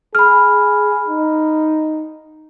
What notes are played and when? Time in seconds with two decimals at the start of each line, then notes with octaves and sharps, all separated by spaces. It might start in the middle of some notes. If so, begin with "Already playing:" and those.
0.15 G#4 B5 F6
1.08 D#4